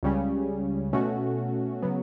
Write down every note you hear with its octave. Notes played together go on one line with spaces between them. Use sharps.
C#2 C#3 G3 C#4
B2 A3 C#4 F#4
C#3 F#3 B3